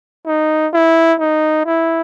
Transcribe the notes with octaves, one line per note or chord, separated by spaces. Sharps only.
D#4
E4
D#4
E4